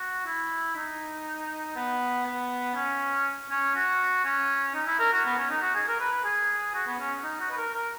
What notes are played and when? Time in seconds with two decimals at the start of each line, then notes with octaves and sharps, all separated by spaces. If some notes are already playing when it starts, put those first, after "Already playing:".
Already playing: F#4
0.26 E4
0.76 D#4
1.76 B3
2.26 B3
2.75 C#4
3.50 C#4
3.75 F#4
4.25 C#4
4.75 D#4
4.87 E4
4.99 A#4
5.12 F#4
5.25 B3
5.37 C#4
5.50 D#4
5.61 F#4
5.75 G#4
5.88 A#4
5.99 B4
6.12 B4
6.25 G#4
6.74 F#4
6.87 B3
6.99 C#4
7.24 D#4
7.40 F#4
7.51 B4
7.57 A#4
7.74 A#4